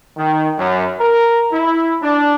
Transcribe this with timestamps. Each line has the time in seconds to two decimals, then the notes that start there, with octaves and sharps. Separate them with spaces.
0.17 D#3
0.57 F#2
1.00 A#4
1.52 E4
2.02 D4